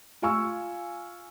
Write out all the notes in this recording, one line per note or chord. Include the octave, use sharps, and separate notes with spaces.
F4 F5 G#5 C#6 E6